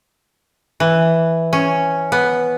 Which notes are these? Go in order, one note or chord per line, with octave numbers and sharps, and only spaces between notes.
E3
C#4
B3